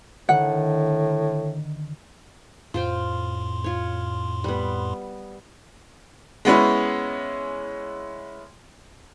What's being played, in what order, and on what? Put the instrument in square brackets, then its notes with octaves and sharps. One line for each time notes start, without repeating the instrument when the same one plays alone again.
[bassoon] A2 [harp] D3 D#3 [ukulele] F#5
[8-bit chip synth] F2 A2 C6 [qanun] F4 C5 G5
[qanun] F4 C#5
G3 B3
[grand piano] G#3 B3 C#4 E4